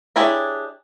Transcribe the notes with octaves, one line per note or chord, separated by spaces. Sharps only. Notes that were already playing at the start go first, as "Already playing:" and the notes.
D4 E4 G4 G#4 C#5